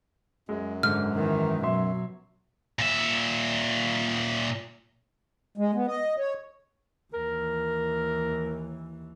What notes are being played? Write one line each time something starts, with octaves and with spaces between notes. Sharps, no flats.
F#2 G#3
G#2 D3 F6
D#3 E3
B2 F#3 E5 C6
A#2 E5
G#3
B3
D#5
C#5
D#2 E3 A#4